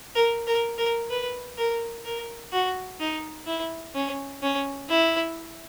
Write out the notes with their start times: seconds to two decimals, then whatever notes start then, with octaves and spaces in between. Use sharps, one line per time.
0.15 A#4
0.47 A#4
0.78 A#4
1.10 B4
1.58 A#4
2.05 A#4
2.53 F#4
3.00 D#4
3.47 E4
3.95 C#4
4.42 C#4
4.89 E4